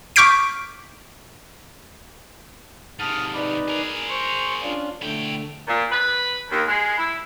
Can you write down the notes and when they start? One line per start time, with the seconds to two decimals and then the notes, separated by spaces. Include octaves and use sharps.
0.16 C#6 D6 F6 G6 B6 D7
2.99 G#2 C3 A5 D#6 F6
3.34 D#4 B4 D5
3.68 G#4 A#4
4.09 C5 C#6
4.63 C#4 D4 F4
5.02 D3 A3 E4 G5
5.67 A#2
5.91 B4
6.50 D#2
6.67 G#3
6.97 E4